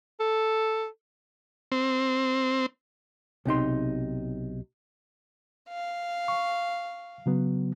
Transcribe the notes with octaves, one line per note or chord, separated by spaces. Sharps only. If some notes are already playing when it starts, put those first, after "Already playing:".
A4
C4
B1 C3 D#4 C6
F5
C#6
C#3 F#3 B3